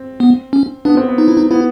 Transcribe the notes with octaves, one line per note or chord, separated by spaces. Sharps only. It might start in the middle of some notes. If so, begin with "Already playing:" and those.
Already playing: C4
B3
C#4
B3 D4
C4
B3
D#4
E4
D#4
B3 E4